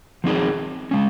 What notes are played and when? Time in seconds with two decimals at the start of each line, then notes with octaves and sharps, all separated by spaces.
0.24 F3 C4 D#4 G#4
0.91 G#3 C#4